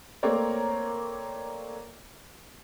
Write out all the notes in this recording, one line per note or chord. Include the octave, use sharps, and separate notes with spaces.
A3 A#3 C4 A#4 C#5 D5